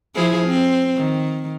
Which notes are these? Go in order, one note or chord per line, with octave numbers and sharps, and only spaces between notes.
F3 E4 G#4
C4
D#3